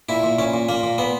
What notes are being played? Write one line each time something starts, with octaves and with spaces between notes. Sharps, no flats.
A#2 E4
A#2
A#2 C#4
A#2
A#2 A#3
A#2
A#2 B3